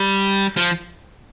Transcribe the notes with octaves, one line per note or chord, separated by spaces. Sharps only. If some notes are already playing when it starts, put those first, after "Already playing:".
Already playing: G3
F3